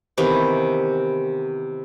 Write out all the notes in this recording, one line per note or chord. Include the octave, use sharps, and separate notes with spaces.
C3 D#3 E3 B3